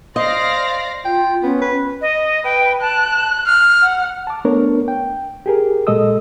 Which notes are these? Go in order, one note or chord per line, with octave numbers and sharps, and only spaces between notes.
C5 D5 D#5 F5 A#6
F4 G5
B3 C#4
B4
D#5
B4 G5
A5 F#6
F6
F#5
A5 D6
A3 B3 D4 A#4 C#5
G5
G4 G#4 A#4
A#2 G#3 A4 D#5 D#6 E6